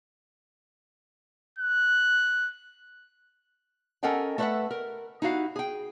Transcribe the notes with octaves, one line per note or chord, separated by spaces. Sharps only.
F#6
C#4 A4 A#4 D#5 F#5 G5
A3 A4 B4 C5 E5 F#5
A#4
D#4 E4 F#4 F5
G#4 G5